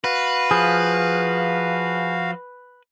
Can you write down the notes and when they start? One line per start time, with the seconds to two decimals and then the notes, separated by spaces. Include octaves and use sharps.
0.04 F#4 B4 F5
0.51 F3 G#4